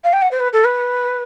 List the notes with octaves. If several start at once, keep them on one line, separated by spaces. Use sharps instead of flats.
F5
G5
F#5
C5
B4
A4
B4